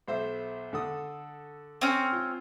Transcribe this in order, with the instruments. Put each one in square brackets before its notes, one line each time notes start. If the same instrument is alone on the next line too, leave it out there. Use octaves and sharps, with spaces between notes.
[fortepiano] B1 C5 E5
D3 A4 D#6
[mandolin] C4 C#4
[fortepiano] F4